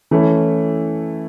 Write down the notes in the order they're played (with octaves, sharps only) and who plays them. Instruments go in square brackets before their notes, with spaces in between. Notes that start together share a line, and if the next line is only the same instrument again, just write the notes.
[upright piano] E3 [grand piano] A3 C#4 E4